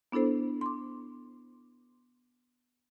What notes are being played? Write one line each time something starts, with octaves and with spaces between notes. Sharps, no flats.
B3 D4 E4 A4 C5
C6 D6